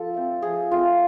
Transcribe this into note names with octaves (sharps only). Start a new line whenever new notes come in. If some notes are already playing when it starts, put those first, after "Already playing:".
Already playing: F3 F4 A4
A3 C4
F3 G#4
A3 C4 F4